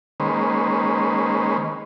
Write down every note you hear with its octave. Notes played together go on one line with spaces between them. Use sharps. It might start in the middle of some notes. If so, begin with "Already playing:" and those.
D#3 G#3 A#3 C#4 B4 C5